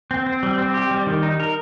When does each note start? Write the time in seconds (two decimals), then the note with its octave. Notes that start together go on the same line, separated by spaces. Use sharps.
0.11 C4
0.27 C4
0.43 G3
0.58 C4
0.74 G4
0.91 G3
1.07 D#3
1.23 D#4
1.40 A#4